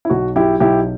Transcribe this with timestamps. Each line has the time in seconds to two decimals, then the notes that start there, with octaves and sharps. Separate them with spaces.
0.05 E4
0.10 B1 F#4
0.36 F#3 E4 G4
0.60 B1 E4 G4